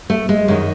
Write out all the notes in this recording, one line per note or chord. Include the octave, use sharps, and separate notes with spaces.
A3
G#3
F#2 D#3 G#3